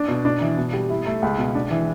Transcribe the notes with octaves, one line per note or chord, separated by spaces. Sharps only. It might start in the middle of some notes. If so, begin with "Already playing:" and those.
Already playing: D4
B2
D4
E3
B2
G3
E4
A3
C#2
B2
D4
E3